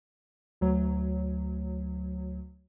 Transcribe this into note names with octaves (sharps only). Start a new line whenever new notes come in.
D2 F#3